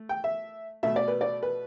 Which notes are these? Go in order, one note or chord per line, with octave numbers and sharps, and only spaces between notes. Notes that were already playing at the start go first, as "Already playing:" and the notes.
Already playing: A3
G5
E5
B2 A3 E5
D5
B4
D5
B4